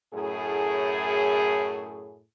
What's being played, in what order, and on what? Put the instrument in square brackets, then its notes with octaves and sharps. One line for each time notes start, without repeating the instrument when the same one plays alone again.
[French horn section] F#2 A2 G#4